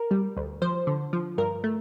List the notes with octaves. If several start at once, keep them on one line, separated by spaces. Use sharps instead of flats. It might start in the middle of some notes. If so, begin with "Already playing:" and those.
Already playing: A#4
G3
D2
F3 C5
D3
F3
G2 A#4
A3